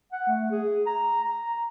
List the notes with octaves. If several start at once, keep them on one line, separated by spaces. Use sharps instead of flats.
F#5
A3
G#4
A#5
A#5